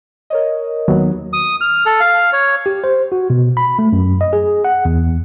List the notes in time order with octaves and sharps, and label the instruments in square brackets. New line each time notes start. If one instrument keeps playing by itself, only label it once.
[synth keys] A#4 C#5 D#5
[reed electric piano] D#2 F#3 B3
[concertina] D#6
F6
A4
F5
C#5
[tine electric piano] G4
C5
F#4
B2
B5
A3
F#2
D#5
G#4
F#5
E2